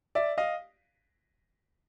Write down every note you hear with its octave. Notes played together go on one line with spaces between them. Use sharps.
D5 E5
D#5 F5